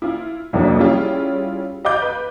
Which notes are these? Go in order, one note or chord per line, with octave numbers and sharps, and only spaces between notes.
E4 F4
C2 F2 F#3 A#3 D4 C#5
G3 C#4 E4 F4 G#4
D#5 F5 D6 G6
B4